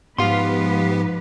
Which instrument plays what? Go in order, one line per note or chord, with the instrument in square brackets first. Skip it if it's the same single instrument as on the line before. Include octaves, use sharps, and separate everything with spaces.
[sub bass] G#2 [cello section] F3 G#3 B4 [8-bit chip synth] B3 G4 [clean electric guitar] F5 C6